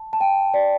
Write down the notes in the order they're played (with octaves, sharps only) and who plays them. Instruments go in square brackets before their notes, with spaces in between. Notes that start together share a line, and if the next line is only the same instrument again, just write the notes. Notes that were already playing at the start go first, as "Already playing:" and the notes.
Already playing: [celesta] A5
A5
G5
D5